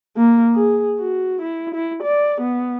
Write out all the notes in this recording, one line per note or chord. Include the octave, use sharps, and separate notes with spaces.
A#3
G#4
F#4
E4
E4
D5
B3